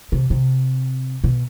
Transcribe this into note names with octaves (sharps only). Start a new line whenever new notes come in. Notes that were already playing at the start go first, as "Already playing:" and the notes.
C3
C3
B2